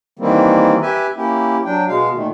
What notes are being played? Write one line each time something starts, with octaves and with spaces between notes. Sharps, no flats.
D#3 E3 G3 A#3 C4
G4 B4 E5 G#5
A#3 C#4 E4 G4
F#3 D4 G5
B2 G#3 F5
A#2 D#3 A3